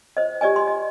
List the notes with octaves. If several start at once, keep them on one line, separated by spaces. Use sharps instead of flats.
C5 D#5
G4 D5 D#5 G#5
C6
D#5